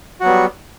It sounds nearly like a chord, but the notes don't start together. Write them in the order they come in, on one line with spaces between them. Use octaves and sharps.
F#4 F#3 B3 G3